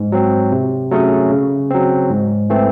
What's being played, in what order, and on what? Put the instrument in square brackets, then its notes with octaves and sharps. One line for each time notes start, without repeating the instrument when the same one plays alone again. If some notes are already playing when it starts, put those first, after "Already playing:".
Already playing: [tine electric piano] G#2
F#3 C4
C3
F#3 A3 C#4 G#4
C#3
F#3 C4
G#2
E3 A3 C4